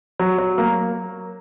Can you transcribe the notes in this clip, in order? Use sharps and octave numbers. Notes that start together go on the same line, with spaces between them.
F#3
F#3
A#3